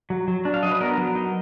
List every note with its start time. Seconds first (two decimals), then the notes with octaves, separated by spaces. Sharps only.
0.10 F#3
0.28 F#3
0.45 D4
0.54 F5
0.63 F#3 D#5
0.71 B4
0.81 B3 A#4
0.98 F#3
1.15 D#4